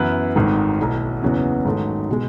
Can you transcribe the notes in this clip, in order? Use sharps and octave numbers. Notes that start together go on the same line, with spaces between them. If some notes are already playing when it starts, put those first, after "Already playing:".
Already playing: F#2 E3 B3 E4 B4
G#1 G#2 D#3 A3
B1 B2 A3 E4
F#1 E2 C#3 F#3 B3
G#2 D#3 F#3 A3
B2 G#3